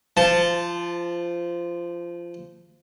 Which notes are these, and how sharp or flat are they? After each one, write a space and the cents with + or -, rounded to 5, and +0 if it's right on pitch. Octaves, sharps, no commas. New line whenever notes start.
F3 -20 A5 +0